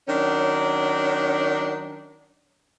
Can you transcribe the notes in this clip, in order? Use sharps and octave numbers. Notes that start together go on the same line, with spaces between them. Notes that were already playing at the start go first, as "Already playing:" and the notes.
D#3 F#3 C#4 D4